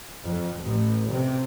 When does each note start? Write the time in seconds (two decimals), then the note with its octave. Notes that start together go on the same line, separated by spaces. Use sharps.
0.24 F2
0.61 A1
1.10 C3